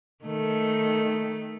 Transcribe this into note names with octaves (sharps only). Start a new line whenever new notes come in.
D#3 A3